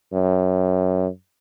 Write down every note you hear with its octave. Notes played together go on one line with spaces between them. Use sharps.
F#2